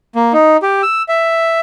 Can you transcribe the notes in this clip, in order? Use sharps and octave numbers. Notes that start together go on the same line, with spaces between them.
A#3
D#4
G4
E6
E5